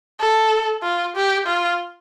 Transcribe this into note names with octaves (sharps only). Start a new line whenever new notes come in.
A4
F4
G4
F4